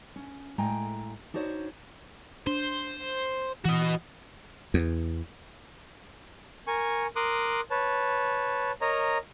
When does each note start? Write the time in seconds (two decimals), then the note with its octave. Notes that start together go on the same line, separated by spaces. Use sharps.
0.16 C#4
0.58 A2 G#3 G5 G#5 A#5
1.34 D4 D#4 F#4 C5 C#5
2.47 D4 C5
3.65 E3 F#4 D#5
4.74 E2
6.67 A#4 G#5 C#6
7.16 A#4 C6 D6 D#6 F#6
7.71 B4 C#5 A5
8.81 A#4 C#5 D#5 A#5